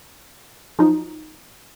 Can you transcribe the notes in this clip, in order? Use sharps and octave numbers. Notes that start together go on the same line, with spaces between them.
F3 F#3 D#4